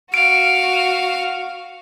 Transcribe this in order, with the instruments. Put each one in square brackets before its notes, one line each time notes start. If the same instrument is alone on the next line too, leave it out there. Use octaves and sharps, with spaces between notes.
[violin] F#4 [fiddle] F5 [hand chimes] D7